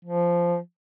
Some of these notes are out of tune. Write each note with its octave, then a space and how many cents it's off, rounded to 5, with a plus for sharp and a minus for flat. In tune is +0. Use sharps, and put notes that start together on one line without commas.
F3 -10